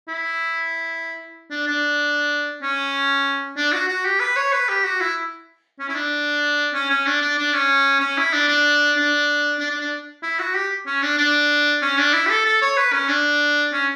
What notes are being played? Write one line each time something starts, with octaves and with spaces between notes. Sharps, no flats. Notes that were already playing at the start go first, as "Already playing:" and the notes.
E4
D4
D4
C#4
D4
F#4
F#4
G4
B4
C#5
B4
G4
F#4
E4
C#4
E4
D4
C#4
C#4
D4
D4
D4
C#4
C#4
E4
D4
D4
D4
D4
D4
D4
E4
F#4
G4
C#4
D4
D4
C#4
D4
E4
G4
A4
A4
C#5
B4
C#4
D4
C#4